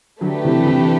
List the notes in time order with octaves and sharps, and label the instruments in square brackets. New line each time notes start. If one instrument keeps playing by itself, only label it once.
[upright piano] D3 F#3 [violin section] A3 D4 G4 B4
[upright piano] C3 E3
C3 E3